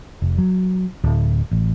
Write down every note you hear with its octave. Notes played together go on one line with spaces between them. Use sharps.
F1
F#3
D1
A1